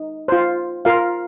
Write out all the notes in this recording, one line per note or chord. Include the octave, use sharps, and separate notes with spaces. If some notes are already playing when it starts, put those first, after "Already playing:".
Already playing: D#4
F4 C5
F4 A#4 F5